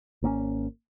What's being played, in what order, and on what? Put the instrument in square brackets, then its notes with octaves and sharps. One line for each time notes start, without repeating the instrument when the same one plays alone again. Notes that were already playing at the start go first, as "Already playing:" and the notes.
[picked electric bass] G#1 A#3 C4 C#4